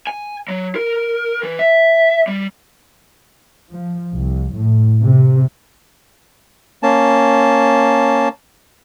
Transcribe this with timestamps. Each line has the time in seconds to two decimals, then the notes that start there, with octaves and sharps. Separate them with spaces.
0.07 G#5
0.48 F#3
0.75 A#4
1.43 E3
1.59 E5
2.27 G3
3.72 F3
4.16 C2
4.56 A2
5.02 C3
6.83 A#3 C#4 A5